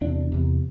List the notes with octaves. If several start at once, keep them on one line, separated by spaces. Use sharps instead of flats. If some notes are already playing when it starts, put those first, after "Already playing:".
E2 C3 D4
E2 C3